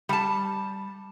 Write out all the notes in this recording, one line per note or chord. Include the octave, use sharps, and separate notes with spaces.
G3 A5